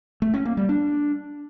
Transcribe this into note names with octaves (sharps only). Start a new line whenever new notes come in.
A3
C#4
A#3
G3
D4